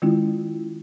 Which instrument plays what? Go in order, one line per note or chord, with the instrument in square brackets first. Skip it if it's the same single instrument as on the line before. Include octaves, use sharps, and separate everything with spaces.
[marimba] D#3 G#3 C#4 E4 F4